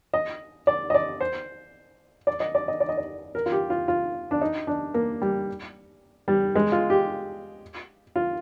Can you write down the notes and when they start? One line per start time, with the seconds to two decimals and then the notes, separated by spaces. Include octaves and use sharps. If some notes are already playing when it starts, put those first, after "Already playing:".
0.14 D#5
0.67 D5
0.90 D#5
0.94 D5
1.21 C5
2.27 D5
2.40 D#5
2.55 D5
2.68 D#5
2.80 D5
2.89 D#5
2.98 D5
3.35 A#4
3.46 F4
3.52 G4
3.70 F4
3.88 F4
4.31 D4
4.41 D#4
4.67 D4
4.94 A#3
5.22 G3
6.28 G3
6.55 G#3
6.72 F4
6.90 G4
8.16 F4